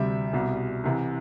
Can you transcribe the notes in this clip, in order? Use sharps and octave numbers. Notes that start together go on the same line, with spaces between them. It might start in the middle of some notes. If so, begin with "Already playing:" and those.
Already playing: D2 C3 G3 E5
C2 B2 G3
C2 C3 E3